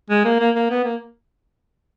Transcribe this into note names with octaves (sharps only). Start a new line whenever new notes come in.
G#3
A#3
A#3
A#3
B3
A#3